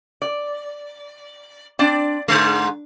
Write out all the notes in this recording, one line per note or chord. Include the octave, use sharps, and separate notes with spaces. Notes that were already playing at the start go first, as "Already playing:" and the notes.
D5
C4 D4 D5
G#2 D3 G#3